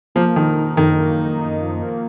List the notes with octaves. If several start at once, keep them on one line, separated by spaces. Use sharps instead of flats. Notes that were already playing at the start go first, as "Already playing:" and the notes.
F3 A#3
D#3 A#3
D#4
F#2 D#3
A#3
D#4
D#4
F3
A#3